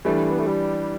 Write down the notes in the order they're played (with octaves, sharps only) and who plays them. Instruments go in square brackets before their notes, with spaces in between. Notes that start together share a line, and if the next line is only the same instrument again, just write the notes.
[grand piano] E3 G3 D4 [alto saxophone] A3
[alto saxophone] B3
A3
G3